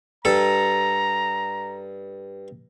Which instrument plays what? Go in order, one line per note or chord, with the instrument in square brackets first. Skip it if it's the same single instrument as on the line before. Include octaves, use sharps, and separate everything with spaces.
[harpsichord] G2 A4 [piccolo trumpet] A#5